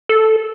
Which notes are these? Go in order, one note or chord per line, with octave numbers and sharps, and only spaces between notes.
A4